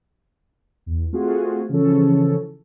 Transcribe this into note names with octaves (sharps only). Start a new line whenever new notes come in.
E2
A3 C4 F4 F#4 G#4
C#3 E3 F3 C#4 A4